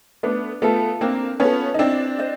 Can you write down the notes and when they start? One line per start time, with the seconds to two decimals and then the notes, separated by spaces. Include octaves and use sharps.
0.23 A3 B3 D4
0.62 A3 B3 F4 A4
1.01 A#3 C4 D4
1.40 B3 C#4 F4 A4
1.74 D#4
1.79 C4 D4 E4
2.19 C5 D#5